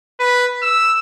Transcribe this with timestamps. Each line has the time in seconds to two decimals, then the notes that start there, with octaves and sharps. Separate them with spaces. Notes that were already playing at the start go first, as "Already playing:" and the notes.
0.20 B4
0.62 E6